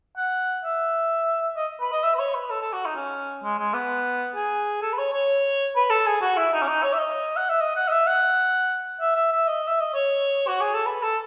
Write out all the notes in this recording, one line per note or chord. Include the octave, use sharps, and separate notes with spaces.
F#5
E5
D#5
B4
D#5
E5
B4
C#5
B4
A4
A4
F#4
D#4
C#4
G#3
G#3
B3
G#4
A4
B4
C#5
C#5
B4
A4
G#4
F#4
E4
D#4
C#4
D#4
C#5
E5
D#5
F#5
E5
D#5
F#5
D#5
E5
F#5
E5
E5
E5
D#5
E5
D#5
C#5
F#4
G#4
A4
B4
A4